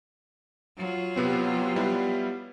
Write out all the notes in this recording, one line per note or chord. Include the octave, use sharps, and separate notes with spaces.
F#3 F4
C3 B3 C4
G3 B3 E4